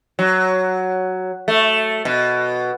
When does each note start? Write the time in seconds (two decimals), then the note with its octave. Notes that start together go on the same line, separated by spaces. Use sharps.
0.19 F#3
1.48 A3
2.05 B2